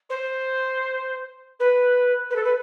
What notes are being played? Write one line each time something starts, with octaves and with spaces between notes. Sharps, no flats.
C5
B4
B4
A4
B4